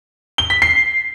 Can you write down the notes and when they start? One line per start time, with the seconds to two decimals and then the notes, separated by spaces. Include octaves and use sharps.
0.38 G7
0.50 B6
0.62 C7